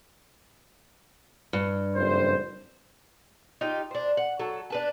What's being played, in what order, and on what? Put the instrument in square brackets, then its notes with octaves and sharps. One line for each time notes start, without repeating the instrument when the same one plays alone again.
[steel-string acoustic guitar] G2
[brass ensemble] F#1 F2 C5
[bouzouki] D#4 F4 G4
D4 C5
F#5
F#3 A4
D4 B4 A5